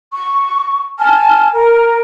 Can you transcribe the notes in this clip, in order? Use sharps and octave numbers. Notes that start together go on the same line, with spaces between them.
C#6
G#5 A5 F6
A#4